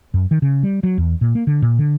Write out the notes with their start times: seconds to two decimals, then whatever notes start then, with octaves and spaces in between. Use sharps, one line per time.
0.14 F#2
0.31 D#3
0.42 C#3
0.63 G3
0.83 F#3
0.98 E2
1.21 A#2
1.35 A#3
1.47 D3
1.62 A#2
1.79 D3